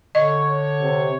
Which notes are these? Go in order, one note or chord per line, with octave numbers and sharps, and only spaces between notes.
D3 C#5 D#5
C3